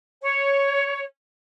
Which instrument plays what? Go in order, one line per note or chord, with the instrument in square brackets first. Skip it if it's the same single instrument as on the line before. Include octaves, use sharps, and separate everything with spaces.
[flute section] C#5